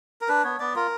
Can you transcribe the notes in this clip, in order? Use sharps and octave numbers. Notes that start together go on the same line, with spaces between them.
A#4
D4 B4
B3 C#5
B3 D5
F4 A#4